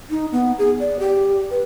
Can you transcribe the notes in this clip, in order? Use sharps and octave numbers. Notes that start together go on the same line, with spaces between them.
D#4
B3
G#4
D5
G4
B4